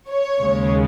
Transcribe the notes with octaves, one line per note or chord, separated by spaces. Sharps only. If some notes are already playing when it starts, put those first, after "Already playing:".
C#5
D#2 C#3 G#3